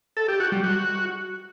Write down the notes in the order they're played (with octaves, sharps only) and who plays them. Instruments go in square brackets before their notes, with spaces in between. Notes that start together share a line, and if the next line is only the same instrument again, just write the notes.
[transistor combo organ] A4
G4
F#4
G3
F#4